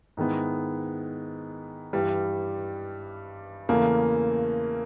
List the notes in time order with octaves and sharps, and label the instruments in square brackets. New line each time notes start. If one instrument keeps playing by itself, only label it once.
[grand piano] G#2 D#3 G#3 B3 E4
G2 E3 G3
[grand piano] E2 C#3 E3 A3 [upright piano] A#3